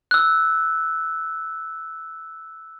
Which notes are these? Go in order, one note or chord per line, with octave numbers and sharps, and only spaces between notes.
E6 F#6